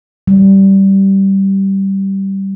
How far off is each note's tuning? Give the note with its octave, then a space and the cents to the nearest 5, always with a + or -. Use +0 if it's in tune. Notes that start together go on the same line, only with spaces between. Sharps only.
G3 -15